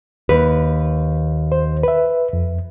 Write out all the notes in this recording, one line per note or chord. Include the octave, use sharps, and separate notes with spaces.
D#2 B4
C5
B4 E5
F2